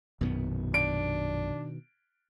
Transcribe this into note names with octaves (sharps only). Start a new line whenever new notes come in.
A#1 F#2 B2 D#3 B3
D4 D7